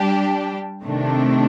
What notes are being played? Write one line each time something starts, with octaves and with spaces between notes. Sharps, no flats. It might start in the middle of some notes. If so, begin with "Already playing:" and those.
Already playing: G3 D4 G4
C3 D#3 A3 D4